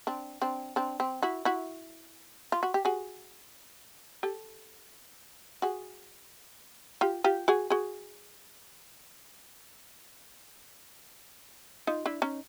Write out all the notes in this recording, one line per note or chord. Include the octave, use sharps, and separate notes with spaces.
C4 D4
C4 D4
C4 D4
C4
E4 F#4
E4 F#4
F4
F#4
G4
F#4 G#4
G4 A4
F#4 G#4
F4 G4
F4 G4
F#4 G#4
F#4 G#4
D#4 F4
D4 E4
C#4 D#4